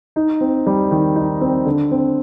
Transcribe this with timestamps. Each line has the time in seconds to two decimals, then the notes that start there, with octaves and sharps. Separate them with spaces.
0.16 D#4
0.41 C4
0.67 G3
0.91 D#3
1.16 D#4
1.41 C4
1.66 D3
1.91 C4